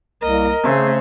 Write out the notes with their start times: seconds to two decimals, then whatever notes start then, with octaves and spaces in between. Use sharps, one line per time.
0.22 C2 A#3 A#4 D#5
0.63 C#3 A3 C4 D#4 G#4 C5